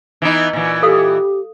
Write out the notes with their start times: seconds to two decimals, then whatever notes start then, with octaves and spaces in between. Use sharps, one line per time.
0.22 E3 B3 D#4
0.53 A#2 E3
0.83 G4 A4 F5 D#6